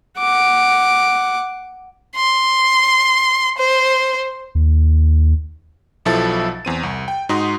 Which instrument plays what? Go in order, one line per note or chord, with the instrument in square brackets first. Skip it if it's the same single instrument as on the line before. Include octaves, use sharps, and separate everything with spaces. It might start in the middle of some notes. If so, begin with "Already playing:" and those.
[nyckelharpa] F#5 D6
[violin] C6
C5
[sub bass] D#2
[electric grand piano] B1 B2 F3 E4 A4 A6
E2 C4 D#7
C2
G5
G#2 D#4 F#4 C6 D#6